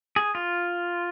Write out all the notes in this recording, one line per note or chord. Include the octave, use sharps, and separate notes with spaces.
G#4
F4